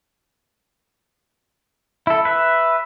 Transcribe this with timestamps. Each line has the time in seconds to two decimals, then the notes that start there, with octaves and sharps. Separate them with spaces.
2.07 E4 A4
2.25 B4 E5